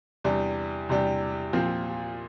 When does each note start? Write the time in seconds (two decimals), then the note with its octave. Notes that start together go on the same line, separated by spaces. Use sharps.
0.24 E2 C3 G3 D4 G4
0.89 E2 C3 G3 D4 G4
1.53 A#2 F3 C4